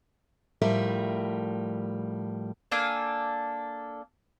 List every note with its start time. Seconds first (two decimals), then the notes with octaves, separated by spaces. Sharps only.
0.62 A2 F3 G3 A#4 E5
2.71 A#3 D4 A4 G#5